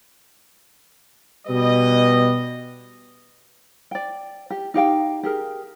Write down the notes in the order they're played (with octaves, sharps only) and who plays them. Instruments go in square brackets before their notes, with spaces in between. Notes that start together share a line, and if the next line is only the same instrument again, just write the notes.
[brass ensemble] B2 G3 B4 D#5
[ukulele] D5 G5
G4
D#4 G4 F5 G5
G4 G#4 A#4